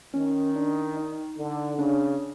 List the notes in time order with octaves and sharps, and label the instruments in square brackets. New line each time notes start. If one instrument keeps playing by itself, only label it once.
[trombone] D#3 [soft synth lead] C#4
[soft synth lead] D4
D#4
[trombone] D3
[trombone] C#3 [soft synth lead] D4